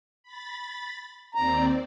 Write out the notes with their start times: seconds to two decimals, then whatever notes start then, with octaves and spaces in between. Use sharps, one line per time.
0.23 B5 A6
1.35 D#2 C4 D5 A#5